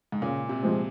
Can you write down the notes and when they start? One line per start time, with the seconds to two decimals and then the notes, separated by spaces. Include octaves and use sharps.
0.12 G#2
0.22 A#2 C#3
0.49 C3
0.62 F3 G#3 C4